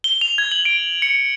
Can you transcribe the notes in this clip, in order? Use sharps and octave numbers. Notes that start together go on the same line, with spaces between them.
G7
F7
G#6
F#7
D7
C#7